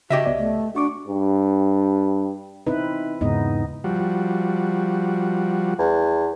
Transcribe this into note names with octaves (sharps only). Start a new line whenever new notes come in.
C#3 F#4 G4 D#5 E5 D6
C2 B3 D5
A3
D4 F#4 C#6 D6
G2
C4 D#4 E4 B4
E2 G#2 C#3 B3 D#4 D#5
F3 G3 F#4
E2